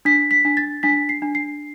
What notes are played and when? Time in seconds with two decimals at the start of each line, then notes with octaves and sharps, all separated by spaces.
0.05 D4 B6
0.31 B6
0.45 D4
0.57 A6
0.83 D4 B6
1.09 C7
1.22 D4
1.35 C7